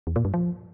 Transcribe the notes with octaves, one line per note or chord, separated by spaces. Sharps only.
E2
A#2
G2
F3